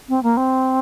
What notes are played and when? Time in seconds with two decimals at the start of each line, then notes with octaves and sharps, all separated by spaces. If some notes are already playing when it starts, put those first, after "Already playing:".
0.09 C4
0.23 A#3
0.37 C4